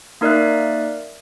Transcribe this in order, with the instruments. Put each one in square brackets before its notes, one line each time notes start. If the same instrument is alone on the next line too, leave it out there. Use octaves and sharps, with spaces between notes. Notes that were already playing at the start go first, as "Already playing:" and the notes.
[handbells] A#3 D#4 A#4 D5 E5 F#6